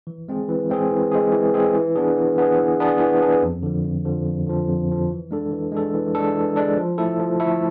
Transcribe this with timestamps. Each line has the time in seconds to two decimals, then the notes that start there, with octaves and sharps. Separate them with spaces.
0.07 E3
0.29 G#3 C4 G#4
0.49 E3
0.70 G#3 C4 G#4
0.91 E3
1.12 G#3 C4 G#4
1.33 E3
1.54 G#3 C4 G#4
1.75 E3
1.96 B3 D4 G#4
2.17 E3
2.38 B3 D4 G#4
2.58 E3
2.80 B3 D4 G#4
3.00 E3
3.21 B3 D4 G#4
3.42 F2
3.63 D3 F3
3.85 F2
4.05 D3 F3
4.26 F2
4.46 D3 F3
4.68 F2
4.89 D3 F3
5.10 E3
5.31 G#3 D4 A4
5.52 E3
5.72 G#3 D4 A4
5.94 E3
6.15 G#3 D4 A4
6.35 E3
6.56 G#3 D4 A4
6.77 F3
6.98 A3 E4 A4
7.19 F3
7.40 A3 E4 A4